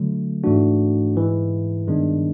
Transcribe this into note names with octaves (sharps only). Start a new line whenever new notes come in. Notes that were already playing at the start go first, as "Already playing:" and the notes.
Already playing: D3 F#3 A3
G#2 E3 A3 D4 F#4
G#2 E3 G#3
G2 D#3 G#3 B3 D4